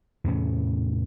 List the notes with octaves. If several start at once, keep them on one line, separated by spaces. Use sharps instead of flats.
E2 A2 C3 C#4